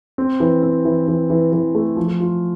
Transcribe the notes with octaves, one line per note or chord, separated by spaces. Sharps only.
C4
E3
C4
E3
E3
E3
E3
A3
F3
F4